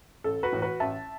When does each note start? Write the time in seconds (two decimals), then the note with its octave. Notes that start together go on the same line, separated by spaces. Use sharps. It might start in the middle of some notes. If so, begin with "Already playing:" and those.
0.24 A1 A4
0.43 F#4 B4
0.52 A2 E3
0.62 F#4 B4
0.80 A1 E5 A5